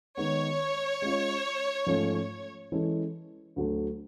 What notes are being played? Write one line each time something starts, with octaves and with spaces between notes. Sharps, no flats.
D#3 G#3 B3 C#5
G#3 C#4 F4
G#2 F3 A3 C#4
E3 G#3 C#4 E4 A4
D2 D3 F#3 A3